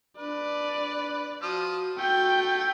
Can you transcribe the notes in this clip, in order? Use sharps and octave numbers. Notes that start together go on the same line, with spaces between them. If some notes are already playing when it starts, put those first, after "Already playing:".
D4 B4 D5
F3 F#4 D#6 F6
A3 F#4 G5 G6